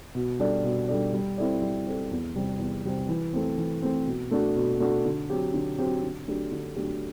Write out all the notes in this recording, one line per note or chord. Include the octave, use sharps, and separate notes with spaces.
B2
G3 D4 A4 D5
B2
G3 D4 A4 D5
G3
C4 E4 A4 D5
G3
C4 E4 A4 D5
E2
C3 G3 C4
E2
C3 G3 C4
E3
A3 C4
E3
A3 C4
B2
A3 D4 F#4
B2
A3 D4 F#4
D3
F#3 C4 G4
D3
F#3 C4 G4
D3
F#3 A3 D4 G4
D3
F#3 A3 D4 G4